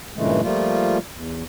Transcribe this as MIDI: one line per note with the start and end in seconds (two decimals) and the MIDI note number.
0.16 0.41 43
0.16 0.41 46
0.16 0.41 49
0.16 0.41 52
0.16 0.41 56
0.16 0.41 57
0.43 0.98 53
0.43 0.98 55
0.43 0.98 57
0.43 0.98 58
0.43 0.98 65
1.14 1.43 40